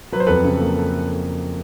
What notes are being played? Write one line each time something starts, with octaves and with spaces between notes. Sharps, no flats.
F#3 B4
C5
F2 A4 B4
C#3
A#3